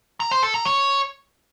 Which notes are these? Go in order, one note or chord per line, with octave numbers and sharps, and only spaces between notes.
A#5
C5
A4
A#5
C#5